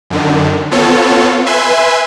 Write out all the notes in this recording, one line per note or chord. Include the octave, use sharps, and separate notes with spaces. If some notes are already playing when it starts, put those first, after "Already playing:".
F#2 D3 D#3
B3 C4 F4 A4 C#5
B4 E5 G#5 C6